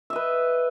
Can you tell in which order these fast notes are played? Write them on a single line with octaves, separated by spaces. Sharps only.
E5 D#5 B4